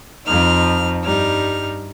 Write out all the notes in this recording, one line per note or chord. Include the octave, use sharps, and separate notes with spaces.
F2 F3 D#4 F6
G2 G3 D#4 F6